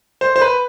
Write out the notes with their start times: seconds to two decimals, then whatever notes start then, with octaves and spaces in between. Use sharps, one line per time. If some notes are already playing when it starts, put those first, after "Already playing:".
0.21 C5
0.36 C5
0.41 B4